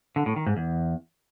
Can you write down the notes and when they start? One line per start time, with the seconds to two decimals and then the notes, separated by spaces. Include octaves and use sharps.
0.16 D3
0.26 A2
0.36 D#3
0.46 G#2
0.57 E2